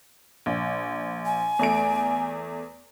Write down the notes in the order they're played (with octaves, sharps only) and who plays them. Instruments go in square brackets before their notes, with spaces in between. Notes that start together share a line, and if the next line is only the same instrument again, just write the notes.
[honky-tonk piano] A#1
[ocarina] G#5
[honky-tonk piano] E2 A3 D7